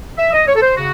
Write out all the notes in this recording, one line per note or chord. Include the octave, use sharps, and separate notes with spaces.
E5
D#5
C#5
A4
C5
C#3 F#4